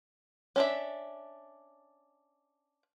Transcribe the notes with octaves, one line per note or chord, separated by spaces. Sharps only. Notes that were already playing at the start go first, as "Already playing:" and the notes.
C#4 D4 E5